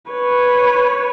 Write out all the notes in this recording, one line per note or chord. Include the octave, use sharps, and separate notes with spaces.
B4 C#5